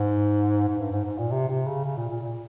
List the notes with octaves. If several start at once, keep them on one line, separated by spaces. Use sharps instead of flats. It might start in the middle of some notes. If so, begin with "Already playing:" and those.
Already playing: G#2
G#2
G2
G#2
G#2
A#2
C3
C3
C#3
C#3
A#2
A#2
A#2